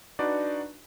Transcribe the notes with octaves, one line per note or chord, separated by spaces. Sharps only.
D4 D#4 F#4 B4 D5